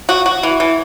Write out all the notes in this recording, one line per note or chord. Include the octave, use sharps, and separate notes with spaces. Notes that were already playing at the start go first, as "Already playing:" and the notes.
F#4
F#4
E3
E3